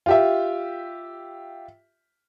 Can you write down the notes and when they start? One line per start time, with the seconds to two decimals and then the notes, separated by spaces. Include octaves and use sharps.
0.06 F4 G4 E5